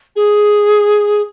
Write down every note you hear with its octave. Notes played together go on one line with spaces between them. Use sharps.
G#4